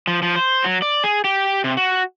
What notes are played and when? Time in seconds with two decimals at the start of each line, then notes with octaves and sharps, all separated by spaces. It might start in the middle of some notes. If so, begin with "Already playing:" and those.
0.07 F3
0.22 F3
0.36 C5
0.64 F#3
0.82 D5
1.04 G#4
1.24 G4
1.64 C3
1.77 F#4